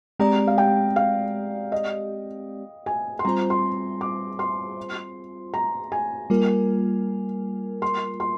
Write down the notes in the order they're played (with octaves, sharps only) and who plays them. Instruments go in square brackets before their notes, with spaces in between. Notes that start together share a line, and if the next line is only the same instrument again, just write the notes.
[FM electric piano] G#3 C4 G4 D5 [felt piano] A#5
[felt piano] F5
G5
F5
D#5
G#5
C6
[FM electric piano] G3 C4 F4 C5 [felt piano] A#5
[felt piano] C6
D6
C6
A#5
G#5
[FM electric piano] G3 A#3 F4 A#4
[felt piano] C6
C6